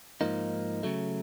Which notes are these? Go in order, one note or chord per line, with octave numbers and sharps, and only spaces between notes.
G#2 F3 A#3 D#4
C#3 F#3 A3